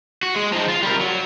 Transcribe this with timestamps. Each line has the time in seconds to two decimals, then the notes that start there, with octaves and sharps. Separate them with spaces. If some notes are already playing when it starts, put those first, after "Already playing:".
0.23 F#4
0.36 G#3
0.53 F3 D#4
0.69 F4
0.82 G3 A#4
1.01 F#3